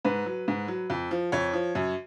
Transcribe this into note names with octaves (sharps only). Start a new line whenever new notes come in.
G#2 B4
F#3
G#2
F#3
F2
F3
F2 C#5
F3
F#2